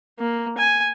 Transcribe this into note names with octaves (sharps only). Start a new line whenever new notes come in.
A#3
G#5